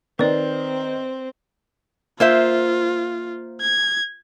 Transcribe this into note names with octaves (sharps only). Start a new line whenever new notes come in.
D#3 C4 B4 D5
A#3 F4 C5 E5
G#6